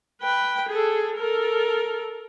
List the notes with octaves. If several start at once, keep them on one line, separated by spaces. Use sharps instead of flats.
B4 G5
G#4 A4
A4 A#4